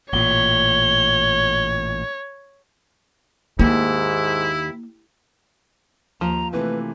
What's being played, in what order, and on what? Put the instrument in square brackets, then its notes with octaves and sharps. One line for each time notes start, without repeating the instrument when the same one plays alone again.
[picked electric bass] A1 A#2 [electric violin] C#5 [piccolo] G7
[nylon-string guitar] D#2 [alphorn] G#2 [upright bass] A#3 [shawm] E4
[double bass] D#2 [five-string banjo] F3 [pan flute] A#5
[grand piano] C3 E3 A#3 [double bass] A3 [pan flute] B4